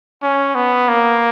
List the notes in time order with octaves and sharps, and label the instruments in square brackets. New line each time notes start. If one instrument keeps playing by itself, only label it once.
[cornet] C#4
B3
A#3